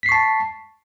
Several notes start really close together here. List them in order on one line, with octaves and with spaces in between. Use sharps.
B6 C7 C#6 A5